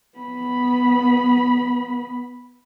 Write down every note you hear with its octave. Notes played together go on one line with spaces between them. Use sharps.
B3 B5